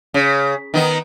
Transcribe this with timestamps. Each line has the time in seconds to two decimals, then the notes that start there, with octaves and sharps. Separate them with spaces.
0.14 C#3
0.74 D#3 B3 D#4